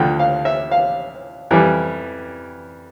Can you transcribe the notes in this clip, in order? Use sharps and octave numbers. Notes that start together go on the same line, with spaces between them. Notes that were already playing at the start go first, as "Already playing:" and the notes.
Already playing: D2 D3 F3 G5
F5
E5
F5
F2 E3 G3